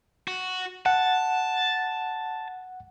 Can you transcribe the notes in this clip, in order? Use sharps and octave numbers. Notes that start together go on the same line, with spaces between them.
F#4
F#5 A5